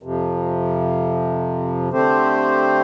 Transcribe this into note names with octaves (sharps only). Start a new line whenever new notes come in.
F2 C3 F3
D3 A3 C4 G4 C5